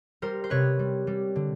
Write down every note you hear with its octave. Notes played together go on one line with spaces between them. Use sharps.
G3 A#4 C5
C5
C3 B4 C#5
G3
G3
D3